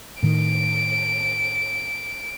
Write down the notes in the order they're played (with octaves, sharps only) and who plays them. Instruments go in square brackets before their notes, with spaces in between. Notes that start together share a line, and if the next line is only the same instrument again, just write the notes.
[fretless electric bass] A2 D#3 [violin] D7